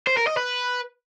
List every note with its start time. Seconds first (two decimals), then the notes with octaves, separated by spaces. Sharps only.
0.07 C5
0.17 A#4
0.27 D#5
0.37 B4